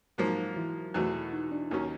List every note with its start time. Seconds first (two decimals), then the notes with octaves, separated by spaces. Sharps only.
0.18 G#2 F3 F#3 A#3 F#4
0.56 E3 E4
0.94 E2 B2 F#3 A3
1.33 D#4
1.51 D4
1.71 D#2 D#3 F#3 A#3 C#4 D#4